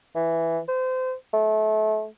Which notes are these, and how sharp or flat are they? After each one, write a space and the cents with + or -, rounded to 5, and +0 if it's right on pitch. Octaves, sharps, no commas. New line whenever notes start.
E3 +5
C5 -30
A3 -30